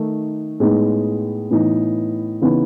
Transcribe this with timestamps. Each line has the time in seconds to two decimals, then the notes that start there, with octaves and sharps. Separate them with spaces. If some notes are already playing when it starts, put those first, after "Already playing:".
Already playing: D#3 A3 D#4
0.60 A2 G#3 B3 D#4
1.51 A2 E3 B3 D#4
2.42 C#3 E3 B3 D#4